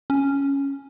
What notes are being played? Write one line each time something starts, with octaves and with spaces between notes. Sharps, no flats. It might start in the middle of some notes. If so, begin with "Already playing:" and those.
C#4